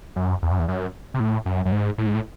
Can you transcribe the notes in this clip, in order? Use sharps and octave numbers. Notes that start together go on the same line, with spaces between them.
F#2
E2
F#2
E2
F#2
C3
A2
F#2
F#2
G#2
A2
G#2
A2